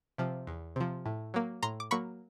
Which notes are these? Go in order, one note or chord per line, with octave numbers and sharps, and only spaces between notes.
C3 F3
E2
C3 F3
A2
F#3 A#3
A2 A#5 C6
D6
F#3 A#3 B5 C#6